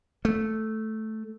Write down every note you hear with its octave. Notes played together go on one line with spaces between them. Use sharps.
A3